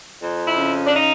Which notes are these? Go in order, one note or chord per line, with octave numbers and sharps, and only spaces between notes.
F2
E4
C#3
D4
D#4